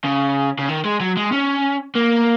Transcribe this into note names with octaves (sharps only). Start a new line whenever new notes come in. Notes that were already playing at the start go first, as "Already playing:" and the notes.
C#3
C#3
D#3
G#3
F#3
G#3
C#4
A#3